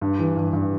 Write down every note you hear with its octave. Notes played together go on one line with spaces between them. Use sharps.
G2
E3
G2
G2